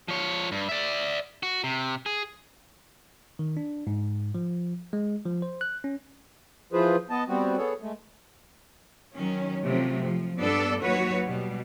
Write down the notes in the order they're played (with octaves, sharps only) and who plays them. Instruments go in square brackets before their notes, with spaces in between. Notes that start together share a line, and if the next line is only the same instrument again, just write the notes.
[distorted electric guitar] F3 C#5
G2
D5 E5
F#4
C3
G#4
[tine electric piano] D#3
D4
G#2
F3
G#3
F3
C5
F#6
C#4
[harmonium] E3 F3 F4 G#4 B4 C5
B3 D#5 A5
G3 B3 C4 F#4
B3 G#4 A4 C#5
G#3 A3
[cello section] D#3 F#3 C#4
C3 F3 F#3 A3
F3
G2 B3 D4 A4 D5
D#2 F#3 F#4 B4 C#5
B2 G3